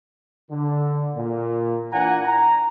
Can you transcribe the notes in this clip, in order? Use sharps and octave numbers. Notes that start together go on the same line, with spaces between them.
D3
A#2
A#2 E3 D4 F#5 G#5 A#5
A#5